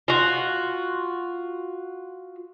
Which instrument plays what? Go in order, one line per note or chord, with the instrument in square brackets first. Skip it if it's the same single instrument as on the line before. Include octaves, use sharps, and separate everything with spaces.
[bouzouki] F4 F#4